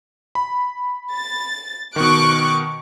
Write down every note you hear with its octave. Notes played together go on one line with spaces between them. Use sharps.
B5
A6
B2 D#3 C#6 D6 F#6